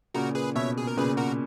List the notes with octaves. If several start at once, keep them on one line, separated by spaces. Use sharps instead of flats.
A#2 C#3 F#4 A#4
G#4 B4
B2 C#5 E5
G#4
A#4
A#2 C#3 G#4 B4
F#4 A#4